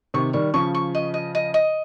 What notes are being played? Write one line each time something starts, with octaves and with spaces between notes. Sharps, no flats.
C3 D#3 C#6
D#3 G3 C#6
C#3 F3 C#6
C#6
D#5
D#5
D#5
D#5